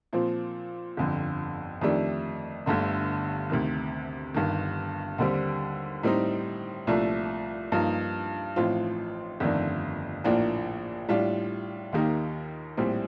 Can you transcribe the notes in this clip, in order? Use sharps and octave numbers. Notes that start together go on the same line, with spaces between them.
A#2 F3 C4
G1 F2 D3
F2 D#3 A3 D4 G4
G1 G2 D3 A3
D2 C3 D#3
G1 G2 D#3
D#2 D3 G3 C4
A2 G3 C4 D#4
C2 A#2 F3 A3 D4
G2 F3 A#3 D#4
A1 A2 F3 C4 F4
G1 F2 D#3 A3 D4
A#1 A2 F3 A#3 D4
A2 G3 D4 F4
D#2 D#3 A#3 D#4 G4
A#1 A2 G3 C4